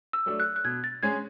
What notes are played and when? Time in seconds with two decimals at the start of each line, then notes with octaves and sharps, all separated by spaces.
0.13 E6
0.26 F#3 A3 D4
0.40 F#6
0.56 F#6
0.64 B2 G#6
0.84 A6
1.02 G#3 C#4 G#4 G#6